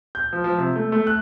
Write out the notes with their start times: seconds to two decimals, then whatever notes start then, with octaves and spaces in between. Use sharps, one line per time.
0.15 G6
0.33 F3
0.44 F3
0.58 C3
0.76 A3
0.92 A3
1.07 F#6